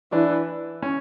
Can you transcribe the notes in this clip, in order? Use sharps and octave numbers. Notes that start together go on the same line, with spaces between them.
E3 D4
C#4